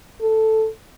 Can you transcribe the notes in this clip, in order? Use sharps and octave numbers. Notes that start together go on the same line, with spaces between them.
A4